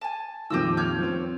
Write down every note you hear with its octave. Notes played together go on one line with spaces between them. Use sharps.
G#5 A5
F2 A#2 D#3 G4 D#5 E6
C#5 F6 G6
F3 C4